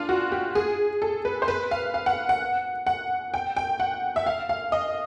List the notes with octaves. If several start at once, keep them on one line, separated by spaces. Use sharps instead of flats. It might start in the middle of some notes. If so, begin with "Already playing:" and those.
Already playing: D4 F4
F#4
G4
G#4
A4
B4
C5
B4
F5
F5
F#5
F#5
F#5
G5
G5
F#5
E5
F5
F5
D#5